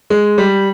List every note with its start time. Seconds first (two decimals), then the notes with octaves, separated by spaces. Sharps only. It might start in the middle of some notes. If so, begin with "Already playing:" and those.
0.10 G#3
0.38 G3